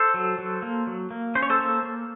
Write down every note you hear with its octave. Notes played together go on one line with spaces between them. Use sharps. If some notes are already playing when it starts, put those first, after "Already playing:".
Already playing: A4 C5
F#3
F#3
A#3
F#3
A#3
C#4 C5
C#5
A4 C5
A#3
A#3